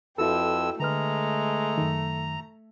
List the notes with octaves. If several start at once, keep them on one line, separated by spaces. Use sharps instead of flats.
F2 E4 F#4 A4 B4 G5 E6
D3 G#3 A3 B4 A#5 F6
F#2 D#3